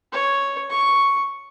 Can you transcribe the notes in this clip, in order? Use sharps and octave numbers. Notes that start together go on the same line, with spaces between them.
C#5
C#6